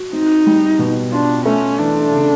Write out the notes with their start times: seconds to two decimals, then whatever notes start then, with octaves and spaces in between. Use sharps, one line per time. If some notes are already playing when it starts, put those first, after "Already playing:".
Already playing: F#4
0.13 C4 D#4
0.46 G3
0.79 B2
1.12 D4 F4
1.45 A3 C#4
1.78 E3 D4
2.11 C#3